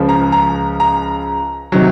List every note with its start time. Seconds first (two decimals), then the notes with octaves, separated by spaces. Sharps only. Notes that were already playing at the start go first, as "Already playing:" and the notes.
Already playing: C#2 C#3 F3
0.09 A#5
0.32 A#5
0.80 A#5
1.72 C3 D#3 F#3